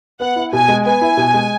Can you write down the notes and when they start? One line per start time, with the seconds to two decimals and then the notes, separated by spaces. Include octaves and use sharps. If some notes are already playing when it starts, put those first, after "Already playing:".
0.20 B3 F#5
0.36 E4
0.53 B2 G#5
0.68 G#3
0.85 B3 G#5
1.01 E4
1.17 B2
1.34 G#3